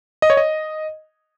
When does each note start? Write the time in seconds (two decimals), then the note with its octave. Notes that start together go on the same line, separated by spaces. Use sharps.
0.22 D#5
0.30 C#5
0.37 D#5